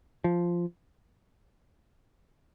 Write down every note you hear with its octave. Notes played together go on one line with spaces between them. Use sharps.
F3